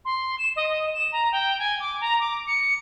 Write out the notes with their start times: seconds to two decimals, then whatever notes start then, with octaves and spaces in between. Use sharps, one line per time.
0.05 C6
0.38 E7
0.56 D#5
0.70 D#5
0.94 E7
1.12 A#5
1.32 G5
1.59 G#5
1.80 D6
2.01 A#5
2.20 D6
2.47 C#7